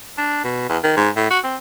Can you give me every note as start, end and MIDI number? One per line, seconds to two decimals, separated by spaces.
0.18 0.41 62
0.44 0.66 47
0.69 0.78 40
0.84 0.92 51
0.97 1.10 44
1.16 1.29 45
1.31 1.39 66
1.44 1.56 60